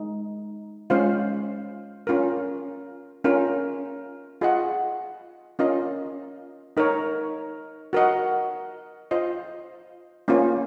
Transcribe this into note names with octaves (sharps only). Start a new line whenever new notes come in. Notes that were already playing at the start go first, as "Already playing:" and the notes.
Already playing: G#3 D#4
G#3 C#4 F4 C5 F5
C#4 F4 A#4
C#4 F4 A#4
F4 G#4 D#5 F#5
C#4 F4 A#4 D#5
D#4 A#4 C#5
F#4 A#4 D#5 F#5
F4 C5 D#5
A#3 C#4 F4 C5